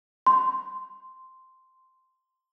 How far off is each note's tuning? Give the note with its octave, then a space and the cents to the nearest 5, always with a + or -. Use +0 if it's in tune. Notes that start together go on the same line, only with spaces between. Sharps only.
C6 -5